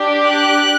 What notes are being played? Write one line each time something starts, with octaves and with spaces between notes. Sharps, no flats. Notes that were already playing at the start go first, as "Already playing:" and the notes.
Already playing: D4 G4
F#6